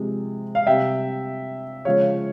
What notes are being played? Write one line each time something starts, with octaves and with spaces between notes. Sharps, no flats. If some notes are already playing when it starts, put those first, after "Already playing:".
Already playing: C3 F3 G#3
F5
C3 G3 E5 G5
C#3 F3 G#3 C#5 F5